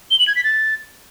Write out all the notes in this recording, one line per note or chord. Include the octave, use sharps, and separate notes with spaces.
G7
F#7
G#6
B6
A6